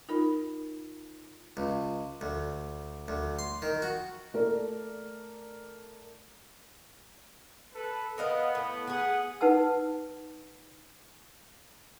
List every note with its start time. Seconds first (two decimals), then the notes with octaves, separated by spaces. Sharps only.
0.09 D#4 F4 A#4 B5
1.57 C#2
2.21 D2
3.08 D2
3.39 C6
3.62 D#3
3.82 F#4
4.34 A3 A#4 D5
7.73 A4 B4
8.18 B3 A#4 D#5 F5
8.55 A2
8.87 B3 G#4 F#5
9.41 D#4 B4 F#5 A5 E6